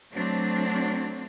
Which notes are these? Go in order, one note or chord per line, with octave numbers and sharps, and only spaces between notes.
F#3 A3 C4 D4